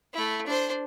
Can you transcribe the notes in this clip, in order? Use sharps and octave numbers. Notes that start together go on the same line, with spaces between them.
A3 E4
D4 C5